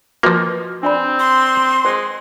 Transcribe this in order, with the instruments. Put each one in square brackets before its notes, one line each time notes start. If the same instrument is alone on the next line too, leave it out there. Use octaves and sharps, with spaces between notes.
[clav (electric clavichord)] F3 A#3 [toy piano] F#4 B4 D#5
[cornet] C4 [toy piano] D4 D5 B5
[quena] C6
[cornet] G#3 [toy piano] C5